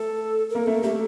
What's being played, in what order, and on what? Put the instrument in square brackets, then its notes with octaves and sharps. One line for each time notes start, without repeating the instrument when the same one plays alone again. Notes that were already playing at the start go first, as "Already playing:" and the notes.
Already playing: [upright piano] A3 [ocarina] A4
[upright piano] A#3 [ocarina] A#4
[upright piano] A3 [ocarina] A4
[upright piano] A3 [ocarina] G4